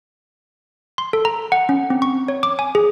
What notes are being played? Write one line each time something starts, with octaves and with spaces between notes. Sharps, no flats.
C6
A4
A#5
F#5
C#4
C4
C#6
C#5
D6
G#5
G#4